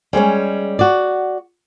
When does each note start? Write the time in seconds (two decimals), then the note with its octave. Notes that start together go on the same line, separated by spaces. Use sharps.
0.13 G3 G#3 C4 C#4
0.79 F#4 D5